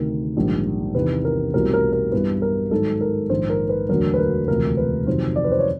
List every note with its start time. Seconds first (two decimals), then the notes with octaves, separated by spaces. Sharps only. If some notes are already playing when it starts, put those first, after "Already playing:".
Already playing: D2 C3 D#3 A#4
0.36 A#1 G#2 D#3 G3
0.95 E2 C3 D#3 B4
1.25 A#4
1.53 B1 A2 E3 G3 C4 A#4
1.73 A#4
1.93 A#4
2.12 G2 E3 G3 B3 B4
2.42 A#4
2.71 G#2 D#3 F#3 A4
3.01 A#4
3.30 A#1 G#2 D#3 C5
3.50 A#4
3.69 B4
3.89 E1 D2 D3 F#3 A#4
4.14 B4
4.19 A#4
4.48 E1 D2 C3 F3 A#4
4.77 B4
5.06 F2 C3 D#3 F#3 C5
5.36 D5
5.44 B4
5.52 C5
5.59 C#5